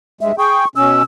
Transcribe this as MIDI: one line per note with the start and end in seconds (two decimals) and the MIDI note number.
0.21 0.32 43
0.21 0.32 56
0.21 0.36 76
0.38 0.65 68
0.38 0.65 79
0.38 0.68 85
0.76 1.02 47
0.76 1.02 61
0.76 1.03 88